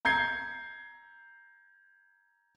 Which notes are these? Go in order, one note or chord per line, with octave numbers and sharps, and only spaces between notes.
A#5 G6 G#6 C7